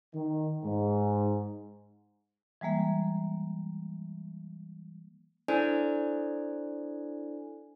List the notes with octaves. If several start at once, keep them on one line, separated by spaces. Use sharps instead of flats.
D#3
G#2
E3 G3 G#3 A#3 E5
D4 E4 A4 C5 D5 G#5